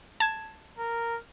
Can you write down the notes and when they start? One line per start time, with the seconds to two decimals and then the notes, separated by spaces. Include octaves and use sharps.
0.20 A5 G#6
0.78 A#4